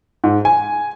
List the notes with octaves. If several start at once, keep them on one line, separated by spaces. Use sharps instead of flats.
G#2
G#5